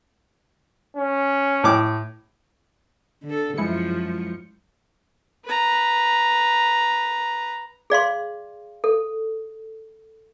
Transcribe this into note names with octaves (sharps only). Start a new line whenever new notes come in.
C#4
A2 D6
D3 A4
F#2 F3 G#3 E4 C#7
B4 A#5
G#4 D5 F5 C6
A4